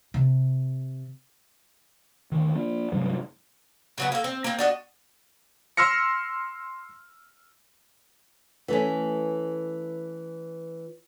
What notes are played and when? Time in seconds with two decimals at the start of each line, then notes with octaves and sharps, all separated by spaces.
0.14 C3
2.32 D2 D#3
2.55 F3 A#3
2.92 G2 C3 F#3 G#3
3.98 C#3 F#3 B3
4.12 A#3 A4
4.24 C4
4.44 A#3 C4
4.59 D4 F#4 D#5
5.77 C6 E6 F6 A#6 C#7
8.68 E3 A3 C#4